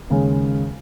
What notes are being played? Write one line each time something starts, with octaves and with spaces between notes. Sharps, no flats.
D#2 C#3 G#3 C#4